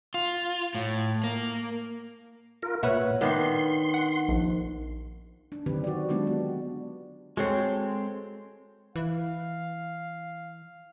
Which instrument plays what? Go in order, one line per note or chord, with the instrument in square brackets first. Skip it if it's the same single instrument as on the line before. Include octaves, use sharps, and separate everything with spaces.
[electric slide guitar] F4
A2
A#3
[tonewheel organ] F4 A#4
[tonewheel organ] A#2 [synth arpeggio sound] B4 C#5 E5 [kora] F#5
[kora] D#3 B3 D4 [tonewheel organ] C6
[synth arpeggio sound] F#5
A#1
[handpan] D4
D3 D#3 F#3 C4 G4 B4
F#4 D5
F#3 G#3 B3 D4 F4 G4
G4
[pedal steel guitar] G#3 C4 [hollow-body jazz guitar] F#4 A4 C#5
[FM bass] E3 [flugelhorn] F5